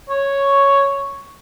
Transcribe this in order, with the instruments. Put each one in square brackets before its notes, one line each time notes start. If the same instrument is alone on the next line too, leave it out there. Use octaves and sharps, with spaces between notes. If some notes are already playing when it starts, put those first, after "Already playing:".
[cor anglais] C#5